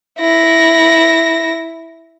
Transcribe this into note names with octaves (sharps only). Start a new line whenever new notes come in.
E4 A#6